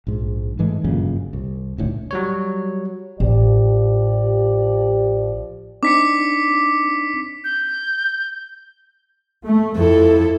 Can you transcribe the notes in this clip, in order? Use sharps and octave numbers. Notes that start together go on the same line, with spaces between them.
A#1 G#2
G#2 E3 G#3 A3
G1 F#2 A#2 C#3
C2
D#1 A2 D3
F#3 G3 C#5
A1 F3 G4 D5
C4 D4 D#4 D6 B6 C#7
G6
A3
F2 E4 A4